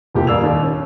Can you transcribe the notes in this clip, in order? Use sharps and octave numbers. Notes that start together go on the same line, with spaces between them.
E1 C2 A#2 G4
D#1 D5 F5 E6 G#6 F7
D#2
C#4